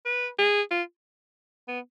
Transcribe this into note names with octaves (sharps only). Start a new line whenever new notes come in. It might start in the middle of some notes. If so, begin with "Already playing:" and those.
B4
G#4
F4
B3